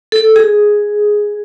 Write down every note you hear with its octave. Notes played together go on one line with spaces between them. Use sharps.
A4
G#4